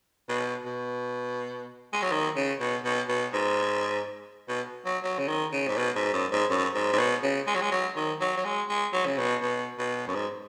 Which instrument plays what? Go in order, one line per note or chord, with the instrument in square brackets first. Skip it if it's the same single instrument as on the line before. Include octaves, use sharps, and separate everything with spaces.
[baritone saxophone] B2
B2
G#3
F#3
D#3
C#3
B2
B2
B2
G#2
B2
F#3
F#3
C#3
D#3
C#3
G#2
B2
G#2
F#2
G#2
F#2
G#2
G#2
B2
C#3
G#3
F#3
G#3
F#3
D#3
F#3
F#3
G#3
G#3
F#3
C#3
B2
B2
B2
F#2
G#2